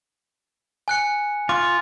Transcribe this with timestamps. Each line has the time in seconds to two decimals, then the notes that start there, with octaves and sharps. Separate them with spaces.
0.88 G#5 F#6 C#7
1.49 F4 D6